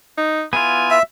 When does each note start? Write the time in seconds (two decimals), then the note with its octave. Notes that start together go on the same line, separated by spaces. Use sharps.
0.17 D#4
0.53 B3 E4 F4 G#5
0.91 E5